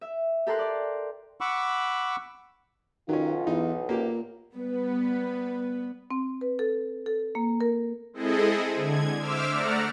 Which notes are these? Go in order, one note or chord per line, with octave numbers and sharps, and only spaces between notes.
E5
G4 A4 A#4 C6 F#6
D5
F#5 B5 C#6 D6 E6
B1 D#3 F#3 C#4 F4
E2 D#4
A#2 A#3 G4 A#4
G3 B3 B4
C4
B4
A4
A4
A#3
A#4
G#3 C4 E4 G#4 A4 D#5
D3 G#6
C5 E5 D6 E6 F6
A3 D5 F#5 A#5 F6